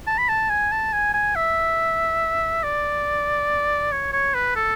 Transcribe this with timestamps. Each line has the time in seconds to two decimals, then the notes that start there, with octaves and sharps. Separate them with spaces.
0.07 A5
0.18 B5
0.29 A5
0.49 G#5
0.72 A5
0.92 G#5
1.14 G#5
1.35 E5
2.64 D5
3.92 C#5
4.13 C#5
4.34 B4
4.56 A4